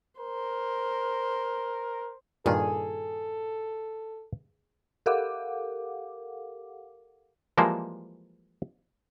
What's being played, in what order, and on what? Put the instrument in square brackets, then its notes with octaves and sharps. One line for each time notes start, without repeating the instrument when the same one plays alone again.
[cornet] A#4 [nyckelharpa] C5
[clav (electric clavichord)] G2 A#2 D#3 [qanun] G#4 [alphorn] A4
[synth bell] G4 A4 A#4 F5 F#5 D6
[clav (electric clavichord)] E3 F3 G3 G#3 A#3 C5